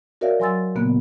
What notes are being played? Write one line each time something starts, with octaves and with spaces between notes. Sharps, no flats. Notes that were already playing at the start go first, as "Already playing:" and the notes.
F#4 A#4 C#5 D5 E5 F5
F#3 G#5 C6 E6 A6
A#2 C#3 A#3 B3 F#6